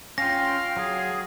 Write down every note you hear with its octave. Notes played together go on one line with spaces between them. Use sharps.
C#4 F4 F5 G5 A#6
F#3 G#4